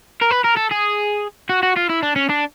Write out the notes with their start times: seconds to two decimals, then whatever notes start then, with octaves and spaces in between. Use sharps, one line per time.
0.21 A#4
0.31 B4
0.44 A#4
0.56 A4
0.71 G#4
1.49 F#4
1.63 F#4
1.76 F4
1.89 E4
2.03 D4
2.16 C#4
2.29 D4